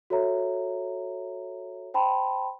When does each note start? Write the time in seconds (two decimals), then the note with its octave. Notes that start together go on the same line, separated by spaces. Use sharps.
0.10 F#4 A4 C#5 E5 A#5
1.94 C5 G5 A5 B5 C6